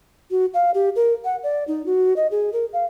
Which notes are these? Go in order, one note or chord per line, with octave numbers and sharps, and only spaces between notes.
F#4
F5
G4
A#4
F#5
D5
D#4
F#4
D#5
G#4
A#4
F5